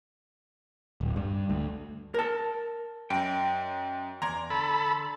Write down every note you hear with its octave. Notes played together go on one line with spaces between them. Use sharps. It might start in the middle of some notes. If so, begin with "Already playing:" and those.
D1
G2
D2
A#4 A5
F#2 D#5 G5
E2 D5 A#5 C6 G#6
D3 A4 B5